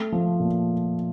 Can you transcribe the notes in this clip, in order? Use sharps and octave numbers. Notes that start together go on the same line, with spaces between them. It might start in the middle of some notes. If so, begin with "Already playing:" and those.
Already playing: A3
F3
A#2